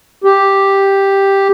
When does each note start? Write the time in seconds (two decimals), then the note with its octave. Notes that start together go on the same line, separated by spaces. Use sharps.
0.24 G4